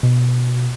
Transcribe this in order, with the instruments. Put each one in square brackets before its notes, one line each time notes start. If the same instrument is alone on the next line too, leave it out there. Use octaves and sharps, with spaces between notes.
[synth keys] B2